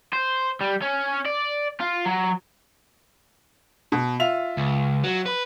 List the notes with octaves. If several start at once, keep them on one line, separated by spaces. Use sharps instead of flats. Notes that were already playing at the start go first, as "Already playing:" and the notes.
C5
G3
C#4
D5
F4
F#3
B2
F4 E5 F7
C#2
F#3
B4